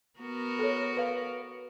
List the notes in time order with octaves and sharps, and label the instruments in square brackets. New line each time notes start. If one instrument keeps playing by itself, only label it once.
[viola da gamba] B3 F#4 A#4
[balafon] A4 C#5
B4 F5